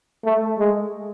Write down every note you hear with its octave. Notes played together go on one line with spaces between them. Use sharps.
A3
G#3